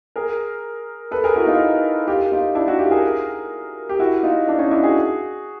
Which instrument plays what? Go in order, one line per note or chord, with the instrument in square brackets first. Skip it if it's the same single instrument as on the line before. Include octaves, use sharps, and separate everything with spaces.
[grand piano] G#4 A#4
A4 B4
G#4 A#4
E4 F#4
D#4 F4
F4 G4
D#4 F4
D4 E4
E4 F#4
F4 G4
G#4 A#4
G4
E4 F#4
D#4 F4
D4 E4
C#4 D#4
D4 E4
F#4 G#4